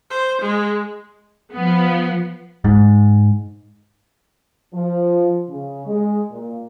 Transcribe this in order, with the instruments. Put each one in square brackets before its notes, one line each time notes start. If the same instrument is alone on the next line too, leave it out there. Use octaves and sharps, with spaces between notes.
[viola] C5
G#3
[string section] F3 B3
[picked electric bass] G#2
[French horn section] F3
C#3
G#3
A#2